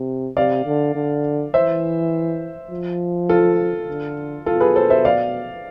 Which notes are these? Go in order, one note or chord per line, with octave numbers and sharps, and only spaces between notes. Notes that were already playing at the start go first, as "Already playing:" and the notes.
Already playing: C3
C3 D5 F5
D3
D3
E3 C5 E5
F3
F4 A4
D3
B2 F4 A4
G#4 B4
A4 C5
C5 E5
D5 F5